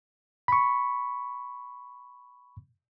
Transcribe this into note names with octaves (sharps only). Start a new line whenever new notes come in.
B5 C#6